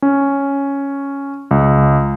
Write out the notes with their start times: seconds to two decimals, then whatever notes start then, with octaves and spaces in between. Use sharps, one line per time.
0.02 C#4
1.51 C#2